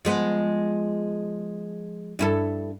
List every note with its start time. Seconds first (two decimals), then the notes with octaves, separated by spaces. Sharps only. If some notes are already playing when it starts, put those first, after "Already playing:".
0.05 F3 G#3 B3
2.19 G2 E4 A4